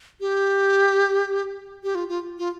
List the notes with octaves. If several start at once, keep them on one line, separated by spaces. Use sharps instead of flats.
G4
G4
F4
F4
F4